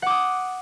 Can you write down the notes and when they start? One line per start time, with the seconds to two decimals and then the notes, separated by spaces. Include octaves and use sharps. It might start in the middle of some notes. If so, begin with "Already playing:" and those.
0.02 F#5
0.06 D6
0.10 D#6